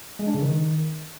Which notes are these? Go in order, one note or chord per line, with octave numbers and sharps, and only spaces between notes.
G#3
D4
C#3
D#3